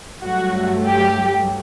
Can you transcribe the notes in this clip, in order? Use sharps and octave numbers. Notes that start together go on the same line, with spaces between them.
G2 F#3 A3 F#4
G4